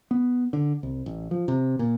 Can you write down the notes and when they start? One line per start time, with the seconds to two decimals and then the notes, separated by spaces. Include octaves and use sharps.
0.11 B3
0.53 D3
0.83 C2
1.06 A1
1.31 F3
1.48 C3
1.79 A#2